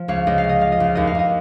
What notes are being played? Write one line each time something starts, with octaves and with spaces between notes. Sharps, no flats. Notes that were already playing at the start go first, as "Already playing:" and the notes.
Already playing: F3
C#2 C#5 F5
C#2 D#5
F5
C#3
D#5
F3 F5
D#5
C#2 F5
D#2 D#5
F5
D#2 D#5